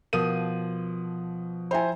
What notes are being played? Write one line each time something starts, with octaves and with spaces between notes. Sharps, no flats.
B2 F3 A#4 D#6 D#7
E4 C5 E5 G5 G#5 B5